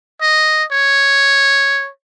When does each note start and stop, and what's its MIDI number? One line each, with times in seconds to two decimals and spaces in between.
0.21 0.64 75
0.72 1.89 73